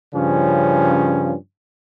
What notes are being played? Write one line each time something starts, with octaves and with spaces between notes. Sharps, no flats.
G2 C#3 F3 C#4